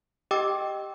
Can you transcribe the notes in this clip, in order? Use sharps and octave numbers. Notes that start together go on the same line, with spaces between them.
G4 D#5 G5 D6 E6